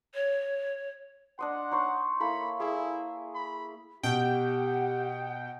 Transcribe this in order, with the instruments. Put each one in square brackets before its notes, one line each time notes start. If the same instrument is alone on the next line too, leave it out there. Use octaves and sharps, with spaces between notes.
[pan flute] C#5
[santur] D4 D#5 C6 [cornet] F#5
[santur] D#4 C#5 C6
[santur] A#3 E4 A4 [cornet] B5
[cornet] E4 [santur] G#4
[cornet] B5
[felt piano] B2 [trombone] G4 [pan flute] F#5 [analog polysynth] G5